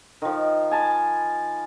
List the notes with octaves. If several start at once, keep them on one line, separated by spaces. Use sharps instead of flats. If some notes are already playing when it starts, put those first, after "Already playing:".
D#3 F3
G#5 A5 B5